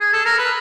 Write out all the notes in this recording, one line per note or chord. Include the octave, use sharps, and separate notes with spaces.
G#4
A4
A#4
B4